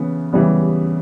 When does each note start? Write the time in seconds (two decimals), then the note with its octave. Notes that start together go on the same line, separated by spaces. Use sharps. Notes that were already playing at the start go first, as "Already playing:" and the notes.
Already playing: C#3 E3 B3
0.33 C#3 E3 G3 B3